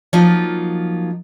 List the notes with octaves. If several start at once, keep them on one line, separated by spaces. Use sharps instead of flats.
F3 F#3 A#3 D#4 F4